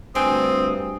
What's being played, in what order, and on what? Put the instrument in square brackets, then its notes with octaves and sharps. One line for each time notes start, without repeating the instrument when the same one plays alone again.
[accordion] D2 D#6 [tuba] G2 [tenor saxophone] C4 [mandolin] D4 A4 G#5